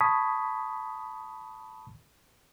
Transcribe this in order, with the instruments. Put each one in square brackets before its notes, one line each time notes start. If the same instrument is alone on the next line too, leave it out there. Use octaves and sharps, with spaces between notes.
[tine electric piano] A5 B5 C#6 D#6 G#6 B6